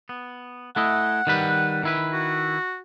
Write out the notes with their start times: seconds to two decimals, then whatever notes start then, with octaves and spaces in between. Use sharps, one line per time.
0.09 B3
0.76 A3 E4 D#5 F#5
1.27 D#3 G3 B4
1.83 D#3 E4 B4
2.13 F#4